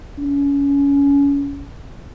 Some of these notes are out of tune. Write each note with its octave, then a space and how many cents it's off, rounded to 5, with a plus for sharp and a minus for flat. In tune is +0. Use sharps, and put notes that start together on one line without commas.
C#4 +25